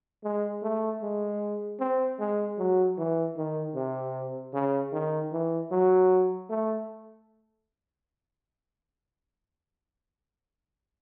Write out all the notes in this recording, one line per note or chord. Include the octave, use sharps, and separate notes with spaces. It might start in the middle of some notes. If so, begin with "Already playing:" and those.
G#3
A3
G#3
C4
G#3
F#3
E3
D#3
C3
C#3
D#3
E3
F#3
A3